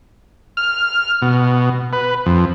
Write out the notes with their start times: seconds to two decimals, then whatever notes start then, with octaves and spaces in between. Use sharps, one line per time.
0.57 F6
1.22 B2
1.93 B4
2.26 F2